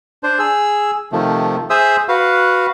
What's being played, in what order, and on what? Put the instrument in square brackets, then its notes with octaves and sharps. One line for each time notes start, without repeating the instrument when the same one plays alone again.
[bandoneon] D4 C5
G#4 E6
C3 D#3 F3 A3
G#4 C5 E5 D#6 E6
F#4 B4 F5